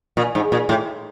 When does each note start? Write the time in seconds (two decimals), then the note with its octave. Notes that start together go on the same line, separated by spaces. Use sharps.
0.17 A#2
0.35 G#2
0.52 A#2
0.69 A2